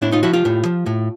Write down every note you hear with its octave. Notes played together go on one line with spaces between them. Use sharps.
A2 D4 E4
D#4 F4
F3 E4 F#4
F4 G4
A2
F3
A2